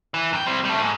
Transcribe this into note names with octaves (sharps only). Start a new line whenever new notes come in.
E3
F#2 G5
G3 C4
G3 A3
G#2